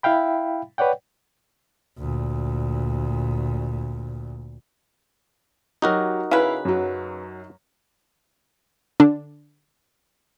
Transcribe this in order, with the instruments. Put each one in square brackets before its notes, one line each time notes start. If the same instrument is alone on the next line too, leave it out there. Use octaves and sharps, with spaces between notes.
[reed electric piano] E4 E5 F5 G5 B5
B4 C#5 D5 F#5 G5
[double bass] D2 A#2
[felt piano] F#3 G4 [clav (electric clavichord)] D#4 F#4 A#4
[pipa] C#3 B4 [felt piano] E4 F5
[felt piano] F#2 F#3
[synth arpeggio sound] D3 D4